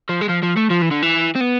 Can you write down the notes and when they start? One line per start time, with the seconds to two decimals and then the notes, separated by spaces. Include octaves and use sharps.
0.09 F3
0.21 G#3
0.29 F3
0.43 F3
0.57 A3
0.70 F3
0.81 E3
0.91 D3
1.02 E3
1.35 C4
1.41 B3